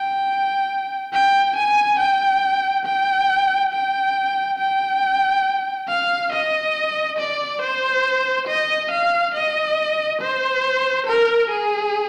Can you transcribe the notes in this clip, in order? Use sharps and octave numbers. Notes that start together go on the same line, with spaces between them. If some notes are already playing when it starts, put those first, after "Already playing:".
Already playing: G5
G5
G#5
G5
G5
G5
G5
F5
D#5
D5
C5
D#5
F5
D#5
C5
A#4
G#4